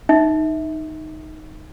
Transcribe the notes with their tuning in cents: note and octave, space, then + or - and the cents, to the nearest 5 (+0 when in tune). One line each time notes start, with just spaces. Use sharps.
D#4 +0 E5 -25